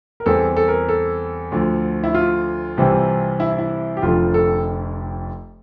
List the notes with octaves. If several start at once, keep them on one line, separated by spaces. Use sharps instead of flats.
A#4
E2 E3 G3 C4 A4
A4
A#4
A4
D2 D3 F3 A3
E4
F4
C2 C3 E3 G3 C4
E4
E4
G4
F1 F2 D3 F3 F4
A4